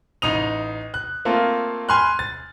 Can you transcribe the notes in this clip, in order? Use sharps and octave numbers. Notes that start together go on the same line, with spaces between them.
A1 D#4 D#6 F7
F#6
A3 A#3 C4 F4
G#5 B5 C6 F6 F#6
A6